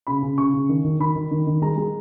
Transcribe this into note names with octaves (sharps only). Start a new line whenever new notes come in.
C#3 B5
C#3
C#3 C#6
C#3
D#3
D#3
D#3 B5
D#3
D#3
D#3
G#3 A#5
G#3